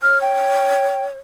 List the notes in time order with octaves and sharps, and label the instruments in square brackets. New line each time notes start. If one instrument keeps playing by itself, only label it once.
[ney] C#5 [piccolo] F6
[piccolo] G5